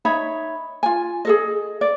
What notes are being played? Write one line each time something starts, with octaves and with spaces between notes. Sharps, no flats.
D#4 C#5 E5 B5
F4 G#5
G#4 A4 D#5
D5